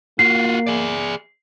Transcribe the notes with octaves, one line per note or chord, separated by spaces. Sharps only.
A#3 F4 F#4 C7
G#4 D5